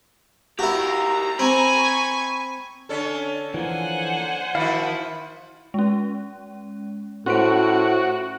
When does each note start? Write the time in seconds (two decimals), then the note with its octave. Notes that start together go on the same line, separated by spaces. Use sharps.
0.59 E4 F#4 G4 A#4 A#5
1.39 C4 G#5 B5 C#6
2.89 D3 C#4 A4
3.54 E3 F3 A#3 C5 F#5 G#5
4.55 D#3 F3 E4 F#4 F5
5.74 G#3 C#4
7.26 A2 C#4 F#4 C5 D7